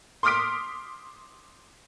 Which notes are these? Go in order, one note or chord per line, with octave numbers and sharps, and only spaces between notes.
C6 D6 D#6 F6 B6 D7